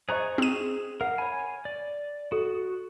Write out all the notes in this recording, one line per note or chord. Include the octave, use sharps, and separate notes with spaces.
G#4 C5 D#5 A#5 C#6
C4 G#4 D#7
A#4 F#5
C#5 G#5 B5
D5
F#4 A4